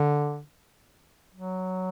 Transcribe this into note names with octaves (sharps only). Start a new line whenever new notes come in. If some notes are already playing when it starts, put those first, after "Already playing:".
Already playing: D3
F#3